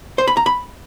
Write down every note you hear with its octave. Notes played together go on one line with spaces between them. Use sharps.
C5
B5
A#5
B5